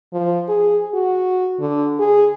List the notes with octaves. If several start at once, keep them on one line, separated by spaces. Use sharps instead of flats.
F3
G#4
F#4
D3
G#4